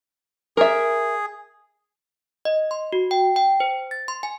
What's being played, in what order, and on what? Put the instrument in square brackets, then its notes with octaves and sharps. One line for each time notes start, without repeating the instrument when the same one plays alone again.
[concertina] G#4 [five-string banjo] A#4 E5
[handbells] D#5
C6
F#4
G5
G5
C5
A6
C6
G#5